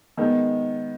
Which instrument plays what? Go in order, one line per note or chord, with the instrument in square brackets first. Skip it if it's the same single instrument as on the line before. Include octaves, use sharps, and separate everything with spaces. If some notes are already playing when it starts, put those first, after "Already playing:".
[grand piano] D#3 G#3 B3